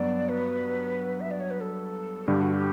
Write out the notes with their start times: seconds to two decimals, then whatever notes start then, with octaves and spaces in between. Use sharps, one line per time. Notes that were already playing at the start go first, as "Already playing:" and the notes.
Already playing: G2 F#3 B3 D5
0.29 B4
1.21 E5
1.31 D5
1.40 C#5
1.51 B4
1.61 A4
2.27 G2 D3 G3 G4
2.41 F#4
2.54 G4